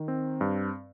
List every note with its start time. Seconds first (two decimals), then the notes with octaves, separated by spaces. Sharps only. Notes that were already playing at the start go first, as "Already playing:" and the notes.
Already playing: D#3
0.08 C4
0.41 G2